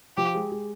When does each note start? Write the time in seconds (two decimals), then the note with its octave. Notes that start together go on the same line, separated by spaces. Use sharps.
0.17 F3 G4
0.35 G#3
0.52 G#3